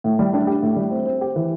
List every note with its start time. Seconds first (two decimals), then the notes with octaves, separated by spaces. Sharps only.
0.04 A2
0.19 G3
0.33 D4
0.47 G4
0.62 A2
0.76 G3
0.91 C4
1.06 C4
1.21 G4
1.36 E3